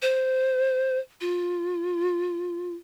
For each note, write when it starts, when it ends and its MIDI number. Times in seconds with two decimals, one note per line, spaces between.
0.02 0.99 72
1.21 2.74 65